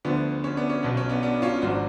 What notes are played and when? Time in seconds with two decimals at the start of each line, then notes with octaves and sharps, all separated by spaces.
0.05 D2 D3 F3 B3
0.44 C#4
0.56 B3 D4
0.70 C#4
0.83 B1 B2 B3
0.97 C#4
1.09 B3 D4
1.23 B3 D4
1.42 C#4 F4
1.58 F4
1.62 G#1 G#2 F3 D4 F#4